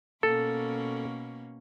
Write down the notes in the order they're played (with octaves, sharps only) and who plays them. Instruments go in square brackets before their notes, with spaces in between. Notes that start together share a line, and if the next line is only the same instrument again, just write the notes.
[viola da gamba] B2 A#3 C#4 [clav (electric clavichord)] A4